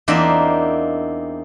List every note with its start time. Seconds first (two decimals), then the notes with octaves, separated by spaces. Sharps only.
0.08 E2 A#3 C4 D4 D#4 E5